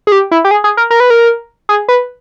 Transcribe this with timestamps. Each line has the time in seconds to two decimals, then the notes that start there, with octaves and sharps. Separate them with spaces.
0.07 G#4
0.12 G4
0.31 E4
0.45 G4
0.51 G#4
0.64 G#4
0.77 A#4
0.91 A#4
1.00 B4
1.10 A#4
1.69 G#4
1.89 B4